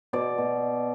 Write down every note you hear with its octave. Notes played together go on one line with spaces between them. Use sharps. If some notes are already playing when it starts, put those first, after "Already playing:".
B2 D5
B2